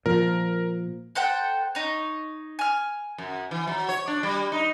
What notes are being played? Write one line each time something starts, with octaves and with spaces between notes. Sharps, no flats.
A#2 F3 A#4
A4 C5 F#5 G5
D#4 C#5
G#5 F6
F#2
E3
F#3
C#5
D4
G3
D#4